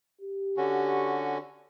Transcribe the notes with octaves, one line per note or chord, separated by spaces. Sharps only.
G4
D3 C#4 F#4